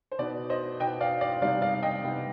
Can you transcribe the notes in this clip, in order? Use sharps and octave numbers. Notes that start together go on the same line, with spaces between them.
C5
B2 B3 D#4 D5
C5 D#5
B2 B3 D#4 D#5 G5
D5 F5
D5 F5
C3 G3 B3 D#4 D5 F5
D5 F5
F5
D#5 G5
C3 G3 B3 D#4